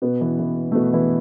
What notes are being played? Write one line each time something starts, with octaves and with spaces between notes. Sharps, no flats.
B2 B3
E3
E3
A3
B2 B3
E3 E4